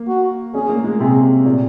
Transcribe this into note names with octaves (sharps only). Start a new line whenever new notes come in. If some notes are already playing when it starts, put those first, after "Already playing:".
Already playing: A#3
F#4
C#4 G#4
A#3
G#3
C3 G#4
A#2